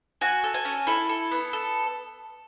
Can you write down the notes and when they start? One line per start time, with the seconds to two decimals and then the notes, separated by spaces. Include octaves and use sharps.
0.21 F#4 G#5
0.44 A4
0.54 G#5
0.65 C#4
0.87 E4 A4
1.09 A4
1.32 B3
1.53 A4